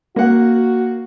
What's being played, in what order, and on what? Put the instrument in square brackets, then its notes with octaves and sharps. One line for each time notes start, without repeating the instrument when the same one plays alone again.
[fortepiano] A#3 F#5 [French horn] F#4